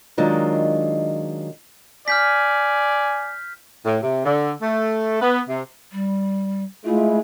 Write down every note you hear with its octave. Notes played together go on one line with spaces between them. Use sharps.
D#3 F#3 G#3 D4 F4
D5 G#5 F6 G6 B6
A2
C3
D3
A3
B3
C3
G3
G#3 A3 E4 F4